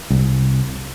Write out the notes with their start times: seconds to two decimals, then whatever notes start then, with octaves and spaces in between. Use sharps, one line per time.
0.10 C2